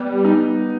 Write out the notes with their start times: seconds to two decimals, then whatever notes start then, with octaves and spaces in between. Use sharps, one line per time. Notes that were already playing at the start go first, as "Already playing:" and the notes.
Already playing: G3 B3
0.25 D#4